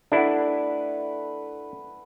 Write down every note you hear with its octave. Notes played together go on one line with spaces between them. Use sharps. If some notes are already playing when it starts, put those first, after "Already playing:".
A3 D4 E4 B4 F#5